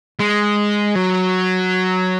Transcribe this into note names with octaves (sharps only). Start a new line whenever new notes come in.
G#3
F#3